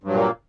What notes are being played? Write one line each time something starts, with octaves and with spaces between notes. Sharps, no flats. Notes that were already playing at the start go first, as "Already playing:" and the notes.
G2 A#2 F#3 A#3